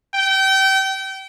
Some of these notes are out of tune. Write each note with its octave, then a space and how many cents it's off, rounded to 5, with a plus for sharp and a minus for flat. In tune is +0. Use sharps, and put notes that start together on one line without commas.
G5 -30